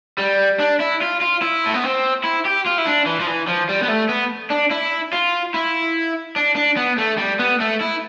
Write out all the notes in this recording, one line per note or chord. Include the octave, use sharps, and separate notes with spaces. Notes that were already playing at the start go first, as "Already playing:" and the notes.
G3
D4
E4
F4
F4
E4
A3
B3
C4
E4
G4
F4
E4
D4
E3
F3
E3
F3
G3
B3
A3
B3
D4
E4
F4
E4
D4
D4
B3
A3
G3
B3
A3
E4